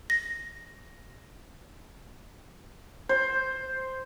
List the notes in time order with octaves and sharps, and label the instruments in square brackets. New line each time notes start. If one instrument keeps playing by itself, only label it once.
[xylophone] A#6
[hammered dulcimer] C5